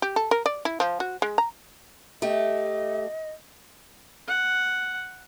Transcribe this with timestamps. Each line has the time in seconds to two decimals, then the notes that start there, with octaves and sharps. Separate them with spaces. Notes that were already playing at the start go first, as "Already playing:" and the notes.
0.02 G4
0.16 A4
0.31 A#4
0.46 D5
0.65 E4
0.80 F3
1.00 F#4
1.22 G#3
1.38 A#5
2.22 A3 G4 D#5
4.28 F#5